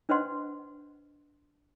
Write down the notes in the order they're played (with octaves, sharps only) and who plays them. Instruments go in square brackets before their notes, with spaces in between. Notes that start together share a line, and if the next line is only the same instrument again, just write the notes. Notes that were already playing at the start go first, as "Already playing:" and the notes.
[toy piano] D4 B4 C5 D#5 F#5 C6